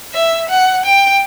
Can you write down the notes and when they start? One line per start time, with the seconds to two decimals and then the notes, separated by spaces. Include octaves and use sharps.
0.14 E5
0.50 F#5
0.85 G5